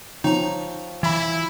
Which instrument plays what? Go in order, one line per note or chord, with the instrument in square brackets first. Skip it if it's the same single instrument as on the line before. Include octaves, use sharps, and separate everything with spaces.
[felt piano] F3 C#5 G5 [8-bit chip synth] D#4 A#5
[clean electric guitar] E3 B5 [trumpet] E4